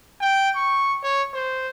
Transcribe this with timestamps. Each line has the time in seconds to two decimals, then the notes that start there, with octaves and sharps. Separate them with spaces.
0.21 G5
0.56 C#6
1.03 C#5
1.34 C5